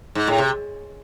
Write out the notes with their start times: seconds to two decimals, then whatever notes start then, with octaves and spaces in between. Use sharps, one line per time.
0.15 G#2
0.27 A2
0.38 C3